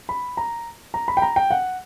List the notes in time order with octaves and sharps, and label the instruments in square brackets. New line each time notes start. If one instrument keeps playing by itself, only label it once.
[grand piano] B5
A#5
A#5
B5
G5
A#5
G5
F#5